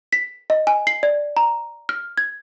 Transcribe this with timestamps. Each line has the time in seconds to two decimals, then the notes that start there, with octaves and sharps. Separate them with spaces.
0.13 B6
0.50 D#5
0.67 G#5
0.87 C7
1.03 D5
1.37 A#5
1.89 F6
2.18 G#6